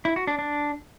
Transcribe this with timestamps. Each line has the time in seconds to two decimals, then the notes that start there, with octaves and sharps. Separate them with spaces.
0.05 E4
0.16 F#4
0.27 D4
0.39 D4